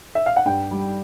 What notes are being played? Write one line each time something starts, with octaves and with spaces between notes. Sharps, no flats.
E5
F5
F#5
G2 G5
G3